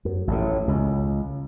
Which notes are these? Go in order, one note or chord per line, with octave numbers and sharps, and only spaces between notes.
F#2
A1 A2
C#2